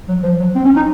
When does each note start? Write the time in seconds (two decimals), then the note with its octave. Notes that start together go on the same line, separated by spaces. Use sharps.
0.09 F#3
0.23 F3
0.39 F#3
0.55 C4
0.65 C#4
0.76 D#4